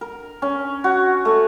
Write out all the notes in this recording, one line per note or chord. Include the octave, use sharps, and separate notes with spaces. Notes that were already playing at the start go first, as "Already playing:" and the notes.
A#4
C#4
F#4
A3